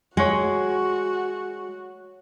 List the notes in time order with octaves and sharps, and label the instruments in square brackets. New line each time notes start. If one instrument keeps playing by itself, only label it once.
[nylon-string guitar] G#3 [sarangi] F#4 [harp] C#5 F#5